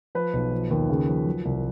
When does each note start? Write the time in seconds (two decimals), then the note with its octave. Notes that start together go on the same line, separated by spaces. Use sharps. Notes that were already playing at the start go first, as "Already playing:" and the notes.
0.15 F3 B4
0.33 B1
0.52 F3
0.70 D#2
0.89 C#3
1.08 F3
1.26 F#3
1.45 C2